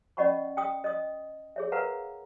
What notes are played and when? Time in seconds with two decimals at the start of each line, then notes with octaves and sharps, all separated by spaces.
0.17 C#4 D5 D#5 F#5 B5 C#6
0.57 G5 D#6
0.84 D#5 D#6
1.56 G#4 C#5 E5
1.72 A#4 B4 F5 F#5 A#5